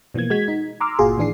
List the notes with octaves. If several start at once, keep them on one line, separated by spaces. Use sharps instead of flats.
B2 E3 F3 A#3 G#6
G#3 F#4 G#6 B6
D#4
A#5 C6 D6 E6 F6
G1 A#2 F4 F#4 G#4 C6
A2 D#3 E3 D4 G#4 C7